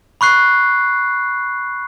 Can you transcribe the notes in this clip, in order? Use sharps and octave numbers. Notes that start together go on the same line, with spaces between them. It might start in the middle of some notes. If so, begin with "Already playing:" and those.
B5 C#6 F#6 C7